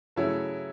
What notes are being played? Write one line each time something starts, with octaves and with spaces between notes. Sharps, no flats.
C#3 F#3 A3 C#4 E4